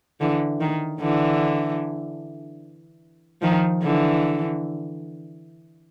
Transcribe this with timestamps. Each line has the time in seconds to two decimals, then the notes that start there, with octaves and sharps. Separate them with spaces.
0.20 D3 E3
0.61 D#3
1.00 D3 E3
3.42 D#3 F3
3.83 D3 E3